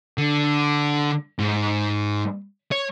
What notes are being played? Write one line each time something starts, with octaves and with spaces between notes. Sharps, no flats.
D3
G#2
C#5